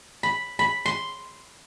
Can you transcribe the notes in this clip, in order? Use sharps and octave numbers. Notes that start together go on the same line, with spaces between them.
B5
B5
C6